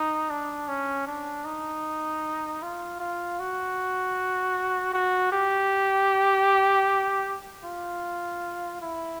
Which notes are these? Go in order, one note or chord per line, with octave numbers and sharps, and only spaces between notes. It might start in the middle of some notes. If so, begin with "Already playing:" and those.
Already playing: D#4
D4
C#4
D4
D#4
F4
F4
F#4
F#4
G4
F4
E4